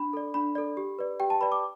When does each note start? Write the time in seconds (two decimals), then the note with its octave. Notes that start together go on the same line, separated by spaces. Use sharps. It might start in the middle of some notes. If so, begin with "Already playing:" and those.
Already playing: D4 B5
0.13 A4 D5
0.34 D4 B5
0.55 A4 D5
0.77 G4
0.99 B4 D5
1.20 G4 G5
1.30 A5
1.41 B4 D5 B5
1.52 D6